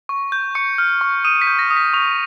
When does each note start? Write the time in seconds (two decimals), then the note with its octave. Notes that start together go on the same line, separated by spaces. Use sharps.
0.09 C#6
0.32 G6
0.55 C#6 C#7
0.78 F6
1.01 C#6
1.24 D#6 D#7
1.42 B6
1.47 G6
1.59 A#6
1.70 D#6
1.77 B6
1.93 C#6 F7